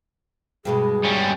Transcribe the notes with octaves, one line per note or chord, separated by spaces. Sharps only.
G2 B2 G#3 G#4
G3 C#4